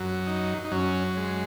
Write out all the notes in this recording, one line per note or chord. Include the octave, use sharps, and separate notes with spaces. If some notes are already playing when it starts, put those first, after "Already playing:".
Already playing: F#2 F#3
D#4
D#4
F#2 F#3 C#4
G#3